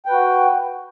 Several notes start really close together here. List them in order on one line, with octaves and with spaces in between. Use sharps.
G5 B4 F#4